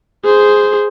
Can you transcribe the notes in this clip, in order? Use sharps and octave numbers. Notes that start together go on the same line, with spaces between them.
G#4 C5